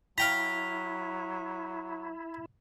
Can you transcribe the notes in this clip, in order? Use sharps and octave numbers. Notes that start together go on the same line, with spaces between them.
F#3 E4 F5 G5 A#5 B6